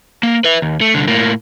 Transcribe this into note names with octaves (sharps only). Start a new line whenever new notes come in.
A#3
B4 E5
D#2
A3
C2 D3
A2 A#3